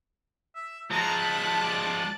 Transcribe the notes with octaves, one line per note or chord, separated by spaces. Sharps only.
E5
F3 G#3 A5 A#5 F#6
B5
D5